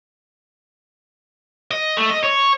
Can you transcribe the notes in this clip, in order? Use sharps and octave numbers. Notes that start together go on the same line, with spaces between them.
D#5
A3
D#5
C#5